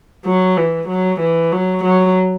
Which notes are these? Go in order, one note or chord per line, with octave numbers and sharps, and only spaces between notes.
F#3
E3
F#3
E3
F#3
F#3